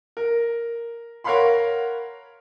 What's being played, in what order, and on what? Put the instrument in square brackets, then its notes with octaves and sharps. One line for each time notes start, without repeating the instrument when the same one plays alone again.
[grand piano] A#4
A#4 C#5 F5 F#5 B5 C6